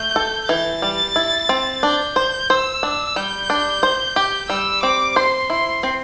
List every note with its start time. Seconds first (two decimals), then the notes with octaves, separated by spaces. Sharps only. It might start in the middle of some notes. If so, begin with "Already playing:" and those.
Already playing: A3 G6
0.16 A4
0.49 E3 A6
0.82 G3
1.16 E4
1.49 C4
1.83 D4 G6
2.16 C5
2.49 C5 E6
2.83 D4
3.16 G3 G6
3.50 D4
3.83 C5
4.16 G4
4.49 G3 E6
4.82 C4 D6
5.16 C5 C6
5.49 E4 C6
5.83 C4